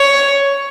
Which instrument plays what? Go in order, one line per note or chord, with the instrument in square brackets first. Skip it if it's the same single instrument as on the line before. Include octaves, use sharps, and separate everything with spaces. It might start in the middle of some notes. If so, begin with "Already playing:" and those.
Already playing: [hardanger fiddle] C#5